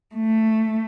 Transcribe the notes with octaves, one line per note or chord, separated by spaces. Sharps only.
A3